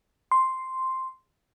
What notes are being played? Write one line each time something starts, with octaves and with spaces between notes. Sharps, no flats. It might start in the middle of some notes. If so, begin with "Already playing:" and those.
C6